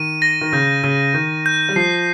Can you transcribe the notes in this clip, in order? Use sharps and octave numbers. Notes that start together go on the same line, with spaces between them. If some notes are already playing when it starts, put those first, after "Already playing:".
Already playing: D#3 D#7
A#6
D#3
C#3 G6
C#3 D#7
D#3 G6
G6
G3
F3 C7